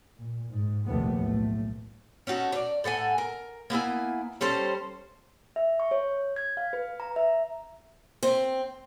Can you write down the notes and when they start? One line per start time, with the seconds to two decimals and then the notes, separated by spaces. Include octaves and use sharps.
0.17 A#2
0.53 G#2
0.87 A#1 D#2 C3 F3 A3 B3
1.18 B1 A2 A3
2.27 C#4 D#4 F#4 A4
2.53 C#5 D5
2.84 A2 A4 F#5 G#5
3.18 A#4
3.70 A#3 B3 E4 G#5
4.41 G3 C#4 A4 C5
5.56 E5
5.80 C#6
5.91 C#5
6.36 G#6
6.57 F5
6.73 B4
7.00 A#5
7.16 E5
8.23 C4